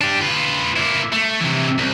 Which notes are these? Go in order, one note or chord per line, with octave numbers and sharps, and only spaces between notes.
D4 G4
F4 B4
A#3 E4
A3
C3 E3
C2